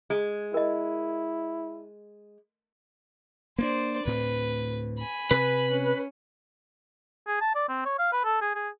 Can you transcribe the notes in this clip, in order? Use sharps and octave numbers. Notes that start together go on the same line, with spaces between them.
G#3
E4 A#4 D#5
A#3 B3 D4 C5 D5
D2 A2 C4 B4
G#5 B5
C3 B4
C#4
G#4
A5
D5
C4
C#5
F5
B4
A4
G#4
G#4